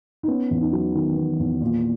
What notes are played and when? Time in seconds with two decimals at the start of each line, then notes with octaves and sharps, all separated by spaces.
0.23 D#4
0.28 B3 C#4
0.51 E2
0.62 D#4
0.73 F#3
0.95 D#3
1.17 B3
1.39 E2
1.61 A#2